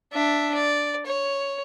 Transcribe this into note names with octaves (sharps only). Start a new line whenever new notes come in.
D4 E5
D5
C#5